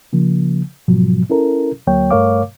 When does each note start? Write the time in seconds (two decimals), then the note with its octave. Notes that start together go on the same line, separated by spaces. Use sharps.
0.13 C#3 F3 A#3
0.88 G#2 B2 F3 F#3
1.30 C#4 E4 A4 A#4
1.87 D2 F#3 A#3 C#5 G5
2.11 G2 A3 A#4 C#5 F5 D6